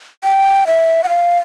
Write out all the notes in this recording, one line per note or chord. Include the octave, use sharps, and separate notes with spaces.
G5
E5
F#5
F5